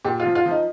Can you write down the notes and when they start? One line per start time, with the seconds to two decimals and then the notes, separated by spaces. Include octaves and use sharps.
0.05 A#2 G4
0.20 F4
0.25 F3
0.35 F4
0.46 F3
0.51 D#4